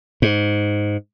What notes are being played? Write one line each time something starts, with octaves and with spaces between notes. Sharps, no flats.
G#2